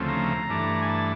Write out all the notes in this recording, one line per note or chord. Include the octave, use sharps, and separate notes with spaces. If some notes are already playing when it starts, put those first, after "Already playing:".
Already playing: D2 C#3 F3 A3 C4
A#5
G2 E3 A3 D4
G#5
A5